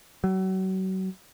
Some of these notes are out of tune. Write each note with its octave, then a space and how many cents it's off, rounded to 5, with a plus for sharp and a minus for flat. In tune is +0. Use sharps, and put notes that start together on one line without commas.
F#3 +35